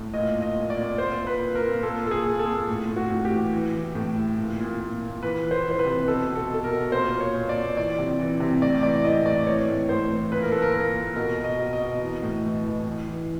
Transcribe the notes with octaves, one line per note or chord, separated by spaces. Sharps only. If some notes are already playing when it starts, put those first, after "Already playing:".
Already playing: A2
A#2 D#5
A#2
D#5
A#2
D5
A#2
A#2 C5
A#2
B4
A#2
A#4
A#2
A#2 A4
A#2 A4
G#4
A#2
A4
A#2
A2
A2
F#4
A2
G4
E3
E3
E3
A2
E3
A#2
A#2
A#2
A#2
E3 B4
E3
C5
E3
C5
B4
C3
B2 A4
B2
A4
B2 A4
A#4
B2
A#2 C5
A#2
C#5
A#2
D5
A#2
E3 D5
C3
E3
C3
A2 D5
E3 D5
E3 D#5
A2 D5
E3 C#5
A2
A2 C5
E3
A#2 B4
A#4
A#2 A4
A#4
A#2 A#4
A#2
B2 A#4
B2
D#5
B2
D#5
B2
E3
A2
E3
E3
E3
E3